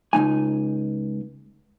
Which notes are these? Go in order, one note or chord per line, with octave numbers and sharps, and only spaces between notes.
C#2 F3 D#4 G#5